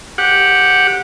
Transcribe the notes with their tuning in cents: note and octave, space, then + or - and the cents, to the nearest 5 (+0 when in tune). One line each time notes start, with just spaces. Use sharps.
G4 +0 F#5 -10